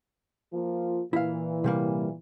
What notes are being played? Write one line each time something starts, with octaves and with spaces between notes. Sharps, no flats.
F3 A#3 F4
A#2 E3 E4 F5
C3 G3 A#3